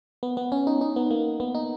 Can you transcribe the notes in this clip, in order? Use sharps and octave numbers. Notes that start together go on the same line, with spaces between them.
B3
B3
C#4
D#4
D#4
B3
A#3
B3
D#4